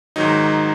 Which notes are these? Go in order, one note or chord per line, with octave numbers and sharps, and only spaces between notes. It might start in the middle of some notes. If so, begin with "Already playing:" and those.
G#2 D#3 F#3 D#4